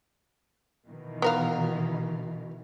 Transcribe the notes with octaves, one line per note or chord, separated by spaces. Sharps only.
B2 D#3 E3
B3 A#4 F5